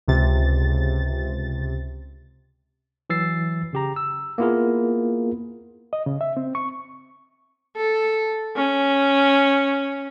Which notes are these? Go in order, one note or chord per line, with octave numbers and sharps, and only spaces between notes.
C#2 C3 A6
E3 F#3 E6 A6 C7
C#3 G4 A#5
E6
A#3 B3 E4 F4 G#4 A#4
D#5
C#3
E5
C4
C#6
A4
C#4